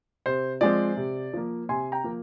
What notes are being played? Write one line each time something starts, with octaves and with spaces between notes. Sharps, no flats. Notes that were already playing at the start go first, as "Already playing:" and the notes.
C3 C5
F3 G#3 C4 D5
C3
F3 A#3
C3 G#5 C6
G5 A#5
F3 A#3